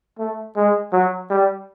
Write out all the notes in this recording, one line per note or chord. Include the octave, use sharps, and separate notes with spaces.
A3
G#3
F#3
G3